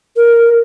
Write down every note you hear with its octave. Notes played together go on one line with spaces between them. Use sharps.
A#4